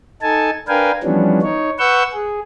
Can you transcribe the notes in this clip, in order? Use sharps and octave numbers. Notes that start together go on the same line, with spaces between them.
D#4 A4 G#5 A5
D4 A#4 B4 F5 G5 G#5
E3 F3 G3 B3 C#4 D4
D#4 C#5
B4 F#5 C#6 E6 G6
G#4